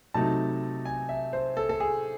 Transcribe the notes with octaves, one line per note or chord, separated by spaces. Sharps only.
C3 F#3 A3 D#4 A5
G#5
E5
C5
A4
A4
G#4